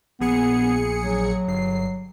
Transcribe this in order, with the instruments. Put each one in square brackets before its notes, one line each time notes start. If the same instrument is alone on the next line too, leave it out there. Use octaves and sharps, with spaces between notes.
[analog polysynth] A#1 G#4 C#7 [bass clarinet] B3
[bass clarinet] F#3
[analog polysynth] G1 C7